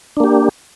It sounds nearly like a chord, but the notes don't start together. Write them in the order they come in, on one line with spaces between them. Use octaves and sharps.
D4 A#3 G4